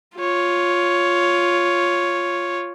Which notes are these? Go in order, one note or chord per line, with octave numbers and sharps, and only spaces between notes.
F4 C#5